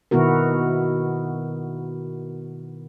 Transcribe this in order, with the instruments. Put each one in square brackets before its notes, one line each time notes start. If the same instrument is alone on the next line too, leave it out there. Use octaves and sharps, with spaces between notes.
[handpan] B2 D#3 B3 E4 F#4 A#4